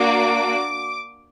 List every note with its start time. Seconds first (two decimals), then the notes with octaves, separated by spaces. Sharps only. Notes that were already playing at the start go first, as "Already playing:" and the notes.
Already playing: A#3 D4 F#4 D6